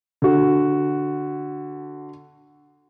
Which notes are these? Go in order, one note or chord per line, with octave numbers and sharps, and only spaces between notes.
D3 F#4